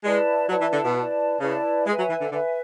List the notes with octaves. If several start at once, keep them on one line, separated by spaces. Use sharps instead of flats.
G#3 E4 B4 D5 A5
F#3 E4 B4 D5 A5
E3
D3
B2
E4 B4 D5 A5
C#3 E4 B4 D5 A5
G#3 B4 E5 G#5
F#3
E3
D3
D3 B4 E5 G#5